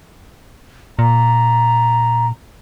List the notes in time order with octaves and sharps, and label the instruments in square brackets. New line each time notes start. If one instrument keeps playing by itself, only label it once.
[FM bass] A#2 [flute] A#5